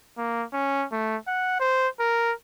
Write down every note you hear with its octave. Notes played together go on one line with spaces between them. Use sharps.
A#3
C#4
A3
F#5
C5
A#4